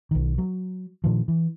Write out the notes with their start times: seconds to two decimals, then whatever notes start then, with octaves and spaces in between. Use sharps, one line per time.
0.11 B1 D#3
0.38 F#3
1.04 A#2 D#3 F3
1.28 E3